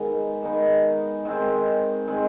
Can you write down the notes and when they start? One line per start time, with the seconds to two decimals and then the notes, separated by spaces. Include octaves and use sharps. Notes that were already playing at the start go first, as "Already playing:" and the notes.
Already playing: D#3 G#3 B3 D#4
0.43 D#3 G#3 B3 D#4
1.25 D#3 G#3 C4
2.08 D#3 G#3 C4